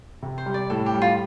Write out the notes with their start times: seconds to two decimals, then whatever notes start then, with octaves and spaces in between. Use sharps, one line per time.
0.23 C3
0.38 C5
0.46 G3
0.54 D5
0.70 A2 A4
0.86 G4
0.94 G3
1.02 F4